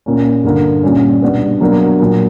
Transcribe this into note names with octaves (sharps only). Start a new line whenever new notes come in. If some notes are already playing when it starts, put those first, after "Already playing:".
A#2 A#3 C#4
G2 D3 A#3
A#2 G3 C#4
B2 G3 B3 D4
B2 F#3 A#3 D4
A#2 F#3 A#3